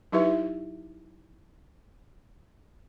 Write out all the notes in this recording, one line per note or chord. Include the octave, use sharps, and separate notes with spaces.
F#3 D#4 E4 G4 B4 E5